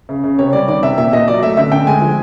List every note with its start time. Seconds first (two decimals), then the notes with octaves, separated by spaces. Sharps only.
0.09 C#3
0.24 C#3
0.38 C3 C#5
0.53 G3 D5
0.68 D#3 D5
0.83 C3 E5
0.97 A#2 E5
1.13 A#2 D#5
1.28 F#3 D5
1.43 A3 E5
1.57 D3 E5
1.72 D3 G5
1.87 G#3 G#5
2.01 F3